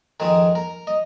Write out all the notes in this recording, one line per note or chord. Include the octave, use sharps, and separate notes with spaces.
F2 D#3 G#3 A#4
A#4
D#5